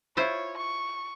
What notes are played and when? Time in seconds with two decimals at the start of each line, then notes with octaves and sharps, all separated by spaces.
0.17 E4 F4 C5 C#5
0.57 C#6